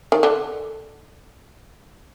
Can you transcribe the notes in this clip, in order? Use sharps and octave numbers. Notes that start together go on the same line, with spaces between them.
D#3
D3